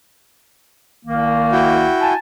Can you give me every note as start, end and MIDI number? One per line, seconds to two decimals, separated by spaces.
1.06 1.89 36
1.06 1.89 51
1.06 1.89 58
1.52 2.13 64
1.52 2.13 66
1.52 2.13 79
2.01 2.16 80
2.01 2.16 81